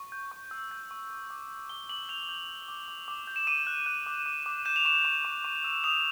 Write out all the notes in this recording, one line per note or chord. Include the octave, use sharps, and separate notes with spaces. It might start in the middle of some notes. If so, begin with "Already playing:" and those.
Already playing: C#6
G6
C#6
E6
G6
C#6
D6
D6
G6
D6 G7
D6 F#7
G6 F7
G6
G6
D6
D6
D6
G6
E7
D6 D#7
F#6
F#6
D6
D6
D6
G6 E7
F7
C#6 E7
C#6
C#6
C#6
E6
D#6 F7